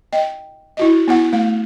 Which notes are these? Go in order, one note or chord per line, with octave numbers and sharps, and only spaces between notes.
D#5 G5
E4 F#4 D#5
B3 E4 F#5
A3 F5